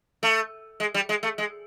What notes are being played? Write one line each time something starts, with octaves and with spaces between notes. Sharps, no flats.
A3
G#3
G3
G#3
A3
G#3